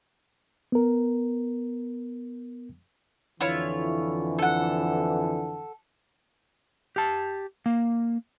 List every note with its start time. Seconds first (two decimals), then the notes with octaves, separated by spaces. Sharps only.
0.72 B3 A#4
3.41 F2 D3 E3 E4 F4 C#5
4.39 A4 F#5
6.96 G4 A5
7.66 A#3